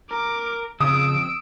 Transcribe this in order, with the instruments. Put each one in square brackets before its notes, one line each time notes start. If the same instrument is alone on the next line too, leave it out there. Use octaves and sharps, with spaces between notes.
[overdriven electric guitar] A#4 [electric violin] D6
[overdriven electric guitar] F2 [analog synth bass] C#3 [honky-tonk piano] D#6 [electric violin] E6 D7